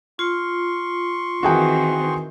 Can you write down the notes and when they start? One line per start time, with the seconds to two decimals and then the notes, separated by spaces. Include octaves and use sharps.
0.19 F4 C6 C#6
1.43 D#3 E3 C4 F#4 G#4 G5